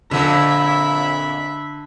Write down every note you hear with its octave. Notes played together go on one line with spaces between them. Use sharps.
F2 A#2 D3 E5 B5